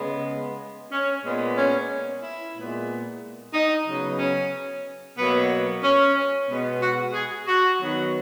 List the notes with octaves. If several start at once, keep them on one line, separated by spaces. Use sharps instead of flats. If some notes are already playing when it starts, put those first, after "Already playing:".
Already playing: C#3 G#3 B3
C#4
A#2 G#3 B3
C#4
E4
A#2 G#3 B3
D#4
C#3 F#3 B3
C#4
B2 F#3 A#3 B3
C#4
B2 G#3 B3
F#4
G#4
F#4
D#3 F#3 B3